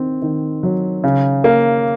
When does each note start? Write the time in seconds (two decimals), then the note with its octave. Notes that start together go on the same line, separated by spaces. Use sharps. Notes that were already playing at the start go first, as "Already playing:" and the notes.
Already playing: D#3 C4
0.22 D#3
0.63 F#3
1.04 C#3
1.44 A#3